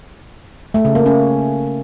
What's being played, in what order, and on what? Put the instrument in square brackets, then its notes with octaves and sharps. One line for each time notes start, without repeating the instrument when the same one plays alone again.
[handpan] A3
C#3
A#3
C#4